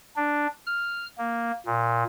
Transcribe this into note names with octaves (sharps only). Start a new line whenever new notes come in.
D4
F6
A#3
A#2